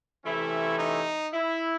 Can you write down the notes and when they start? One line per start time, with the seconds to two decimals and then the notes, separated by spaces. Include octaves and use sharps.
0.23 C3 E3 A3 C#4 E4
0.78 D#4
1.33 E4